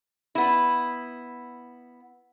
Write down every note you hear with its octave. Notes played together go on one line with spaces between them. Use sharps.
B3 E4